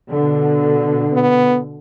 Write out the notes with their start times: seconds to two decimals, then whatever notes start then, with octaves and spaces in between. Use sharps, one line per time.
0.10 B2 D3
1.13 B3